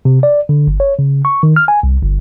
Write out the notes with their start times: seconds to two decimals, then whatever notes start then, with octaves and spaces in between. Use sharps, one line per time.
0.05 C3
0.23 D5
0.49 D3
0.67 G1
0.80 C#5
0.99 C#3
1.25 C#6
1.43 D#3
1.56 F6
1.68 G#5
1.83 C2
2.02 G1